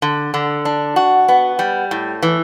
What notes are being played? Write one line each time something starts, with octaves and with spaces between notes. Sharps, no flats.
D3
D3
D4
F#4
B3
G3
A2
E3